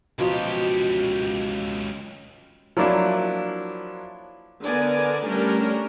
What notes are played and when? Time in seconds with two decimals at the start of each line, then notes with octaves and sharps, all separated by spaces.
0.19 C#2 B2 F3 D#4 G4
2.77 F3 F#3 A#3 D4 E4
4.64 D3 B3 A#4 D5 G#5
5.27 G3 A3 C#4 D4 A#4